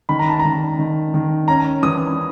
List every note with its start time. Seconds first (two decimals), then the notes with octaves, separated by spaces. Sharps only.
0.09 D#3 B5
0.19 A#5
0.29 A5
0.39 D#3 A#5
0.79 D#3
1.14 D#3
1.48 C#4 A#5
1.82 E3 D#6